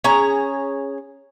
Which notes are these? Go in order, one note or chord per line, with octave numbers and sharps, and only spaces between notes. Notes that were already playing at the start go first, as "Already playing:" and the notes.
C#4 G#4 A#5